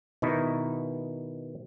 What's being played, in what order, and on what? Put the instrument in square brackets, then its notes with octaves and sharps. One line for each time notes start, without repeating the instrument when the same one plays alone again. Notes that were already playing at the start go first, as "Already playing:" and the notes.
[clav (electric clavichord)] B2 D#3 D#4 E4